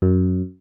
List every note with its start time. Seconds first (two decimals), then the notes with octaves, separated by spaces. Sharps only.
0.02 F#2